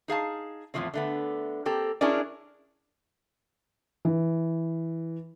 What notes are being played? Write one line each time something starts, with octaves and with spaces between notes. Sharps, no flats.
D#4 G#4 F5 A5
E2 A2 C3 F3 A3 C4
D3 A3 B3
A#3 C4 G4 A4
C#4 D4 E4 G#4 A#4 D5
E3